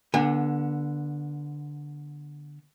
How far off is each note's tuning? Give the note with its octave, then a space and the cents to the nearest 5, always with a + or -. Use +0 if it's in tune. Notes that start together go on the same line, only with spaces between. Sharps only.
D3 +0 B3 -35 G#5 -40